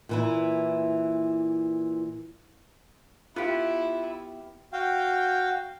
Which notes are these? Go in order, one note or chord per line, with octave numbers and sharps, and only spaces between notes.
A#2 E3 E4
B3 E4 F4 G4
F#4 F5 G5